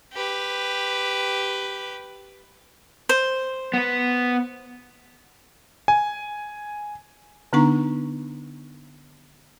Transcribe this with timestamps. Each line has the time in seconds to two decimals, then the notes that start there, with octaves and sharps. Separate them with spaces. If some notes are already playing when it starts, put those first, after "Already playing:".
0.13 G4 B4
3.09 C5
3.74 B3 B4
5.88 G#5
7.53 D3 B3 D4 D#4 A#5 C#6